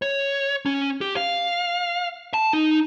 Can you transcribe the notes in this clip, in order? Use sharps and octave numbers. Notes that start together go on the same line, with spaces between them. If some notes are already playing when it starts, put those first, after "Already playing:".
C#5
C#4
G4
F5
A5
D#4